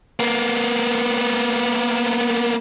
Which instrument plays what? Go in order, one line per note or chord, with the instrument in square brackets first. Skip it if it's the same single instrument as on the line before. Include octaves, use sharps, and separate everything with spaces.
[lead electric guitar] A#3 B3